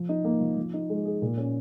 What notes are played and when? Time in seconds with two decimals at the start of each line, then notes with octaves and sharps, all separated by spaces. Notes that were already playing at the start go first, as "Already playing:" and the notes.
Already playing: F3
0.09 D#4
0.25 A#3
0.40 F3
0.57 F3
0.73 D#4
0.90 G#3
1.06 G#4
1.22 A#2
1.38 C#4